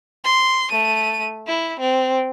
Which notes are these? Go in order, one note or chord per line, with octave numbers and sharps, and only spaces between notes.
C6
A3 D#7
E4
C4